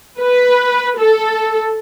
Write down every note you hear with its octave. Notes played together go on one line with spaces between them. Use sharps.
B4
A4